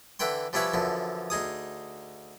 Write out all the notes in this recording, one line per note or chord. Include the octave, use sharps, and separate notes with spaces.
D3 E3 B4 G5 C6
F3 G3 C#4 E4 B4 C#5
F#2 D3 E3 F3
D2 D#4 G#4 D#6